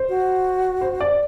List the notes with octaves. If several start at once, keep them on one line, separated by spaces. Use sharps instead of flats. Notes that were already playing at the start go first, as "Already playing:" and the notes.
Already playing: C5
F#4
C5
D5